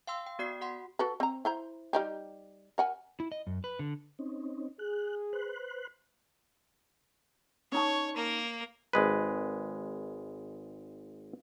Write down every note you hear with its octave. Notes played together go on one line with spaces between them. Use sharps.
F5 G5 C6 E6
G5
B3 F#4 D5 D#6 C7
F#4 F#5 C6
F#4 A4 B4
C4 A#5
E4 C5 A#5
G3 D#4 G4
A#4 F#5 G#5
E4
D#5
F#2
B4
D3
C4 C#4 D#4
G#4 F#6
B4 C5 F#6
C#4 D#4 C#5 A5
A#3 A#4
G#1 G#3 B4